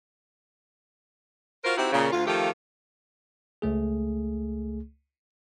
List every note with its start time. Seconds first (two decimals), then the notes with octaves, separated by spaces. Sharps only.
1.64 F4 F#4 A#4 C5
1.77 C4 D#4 E4 F#4 G4
1.92 A#2 C#3
2.11 D2 F4
2.26 D#3 F3 A3 F4 G4
3.62 C#2 A3 G#4